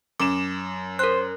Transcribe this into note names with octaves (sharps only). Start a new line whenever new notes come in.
F#2 D6 E7
A#4 C5 F#6